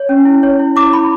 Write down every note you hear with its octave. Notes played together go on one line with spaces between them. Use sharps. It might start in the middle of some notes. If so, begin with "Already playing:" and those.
Already playing: C#5
C#4
E4
C#5
E4
E4 D6
E4 B5